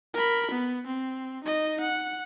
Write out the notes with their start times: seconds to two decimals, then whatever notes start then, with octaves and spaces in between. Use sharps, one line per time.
0.14 A#4 B5
0.51 B3
0.87 C4
1.44 D#4 D#5
1.81 F#5